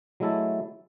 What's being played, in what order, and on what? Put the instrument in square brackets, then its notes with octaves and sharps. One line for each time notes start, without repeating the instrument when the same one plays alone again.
[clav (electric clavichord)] F#3 G#3 A3 E4 E5 A5